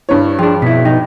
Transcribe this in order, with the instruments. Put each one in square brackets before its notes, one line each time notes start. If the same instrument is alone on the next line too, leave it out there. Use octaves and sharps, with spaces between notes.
[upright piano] G2 C#5 [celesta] E4
[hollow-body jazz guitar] F3 D4 [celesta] G#4 G5
[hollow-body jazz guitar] F2 E4 [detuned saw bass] B2 [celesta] B6
[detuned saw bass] B2 [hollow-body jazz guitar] D#4 [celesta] G5